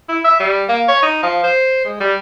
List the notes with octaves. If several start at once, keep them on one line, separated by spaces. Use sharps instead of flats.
E4
E5
G3
A#3
C#5
D#4
F3
C5
G#3
G3